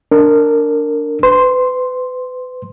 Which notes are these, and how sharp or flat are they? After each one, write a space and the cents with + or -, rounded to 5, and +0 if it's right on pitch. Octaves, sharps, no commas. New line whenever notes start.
D4 -5 A#4 -15
B4 +35 C6 +0